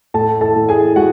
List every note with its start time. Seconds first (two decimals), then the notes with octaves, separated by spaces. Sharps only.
0.14 A2 A4 A5
0.41 A4 A5
0.56 A2
0.69 G#4 G#5
0.96 G#3 F#4 F#5